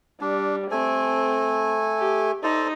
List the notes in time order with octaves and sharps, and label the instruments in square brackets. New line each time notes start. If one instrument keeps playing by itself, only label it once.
[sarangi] G3 [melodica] D4
[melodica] A3 A4 G#5 [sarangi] C4
[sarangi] G4
[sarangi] D#4 [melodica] A4 C5 D5